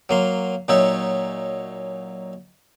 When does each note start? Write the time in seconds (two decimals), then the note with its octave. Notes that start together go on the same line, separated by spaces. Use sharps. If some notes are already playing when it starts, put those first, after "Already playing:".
0.09 F#3 A#3 C6
0.68 A#2 F#3 D#4 C#5 E5